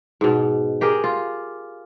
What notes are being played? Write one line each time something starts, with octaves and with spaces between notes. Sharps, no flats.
G#2 B2
G4 G#4 A#4
F4